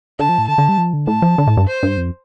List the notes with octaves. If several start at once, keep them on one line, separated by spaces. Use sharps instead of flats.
D3 A5
F3
A2
D3 A5
D3
G3
F3
D3
A2 A5
F3
D3
A2
G2
C5
G2
F2